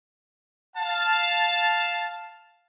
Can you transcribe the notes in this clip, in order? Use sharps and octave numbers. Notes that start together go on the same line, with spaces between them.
F5 A5